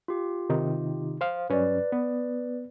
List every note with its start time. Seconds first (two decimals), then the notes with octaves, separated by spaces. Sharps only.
0.08 F4 G4
0.50 C3 D#3 D#4
1.21 C5 F5
1.50 G2 F#3 C#4 B4 D5
1.92 B3